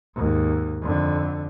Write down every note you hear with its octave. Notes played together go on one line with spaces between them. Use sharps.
D#2 G#2
F2 D3